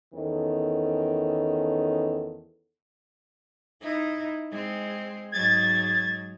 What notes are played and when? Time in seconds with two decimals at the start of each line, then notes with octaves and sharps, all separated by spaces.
0.13 E2 D#3 C#4 A4
3.81 D#4 E4
4.51 G#3 C4
5.32 G#2 F#3 G#3 G#6 A6